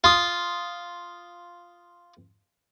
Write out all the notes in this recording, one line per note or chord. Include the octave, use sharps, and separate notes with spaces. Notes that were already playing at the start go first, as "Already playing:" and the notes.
F4 D#6